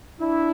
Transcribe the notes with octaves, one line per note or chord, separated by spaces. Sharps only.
D4 E4